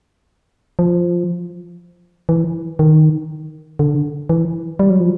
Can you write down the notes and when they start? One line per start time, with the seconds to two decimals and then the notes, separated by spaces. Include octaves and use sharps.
0.79 F3
2.29 E3
2.79 D#3
3.79 D3
4.29 E3
4.79 G3
4.90 F#3
5.00 F3